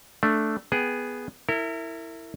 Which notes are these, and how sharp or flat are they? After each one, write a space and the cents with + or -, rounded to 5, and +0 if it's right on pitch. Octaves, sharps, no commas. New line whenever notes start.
A3 +0 D4 +0
B3 +0 G#4 +0 G5 -10
E4 +0 A#4 -35